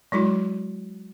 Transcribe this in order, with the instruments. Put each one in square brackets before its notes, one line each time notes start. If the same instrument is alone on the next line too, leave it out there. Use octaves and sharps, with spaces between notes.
[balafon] F#3 G#3 E4 F#4